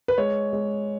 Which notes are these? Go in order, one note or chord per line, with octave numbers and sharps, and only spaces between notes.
B4
G#3 C#5
G#3